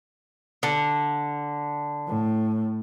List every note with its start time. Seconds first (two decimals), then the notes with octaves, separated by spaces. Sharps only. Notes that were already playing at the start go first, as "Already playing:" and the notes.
0.63 D3
2.07 A2